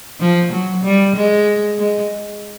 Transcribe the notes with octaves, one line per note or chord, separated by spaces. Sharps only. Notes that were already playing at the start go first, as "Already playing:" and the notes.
F3
F#3
G3
G#3
G#3